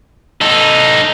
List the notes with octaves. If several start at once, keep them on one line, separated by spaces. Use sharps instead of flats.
D#4 A4